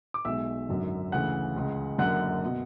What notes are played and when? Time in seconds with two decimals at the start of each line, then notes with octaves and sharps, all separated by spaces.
0.14 D6
0.25 B1 B2 G#3 E5 E6
0.69 G#1 F#2 D3 F#3
1.12 D2 C#3 E3 F#5 F#6
1.56 C#2 C#3 G#3
1.99 F#1 F#2 D3 F#5 F#6
2.45 B2